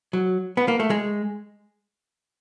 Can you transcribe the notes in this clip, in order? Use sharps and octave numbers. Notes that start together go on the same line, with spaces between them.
F#3
B3
A#3
A3
G#3